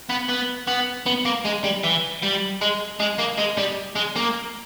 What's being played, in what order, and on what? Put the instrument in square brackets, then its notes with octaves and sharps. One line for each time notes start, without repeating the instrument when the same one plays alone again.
[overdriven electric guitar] B3
B3
B3
B3
A#3
G#3
G3
E3
G3
G#3
G#3
A#3
G#3
G3
G#3
A#3